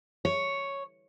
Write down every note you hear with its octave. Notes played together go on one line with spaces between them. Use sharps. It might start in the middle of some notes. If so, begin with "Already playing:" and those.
C#5